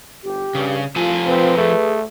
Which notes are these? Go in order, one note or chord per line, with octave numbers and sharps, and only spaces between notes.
G1 G4
G2 C#3
C2 F3 F4 A4 G#5
C4 B4
A3 G#4